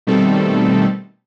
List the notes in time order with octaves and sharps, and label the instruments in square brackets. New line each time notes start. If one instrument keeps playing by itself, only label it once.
[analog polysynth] B2 D#3 G3 A3 C4 A4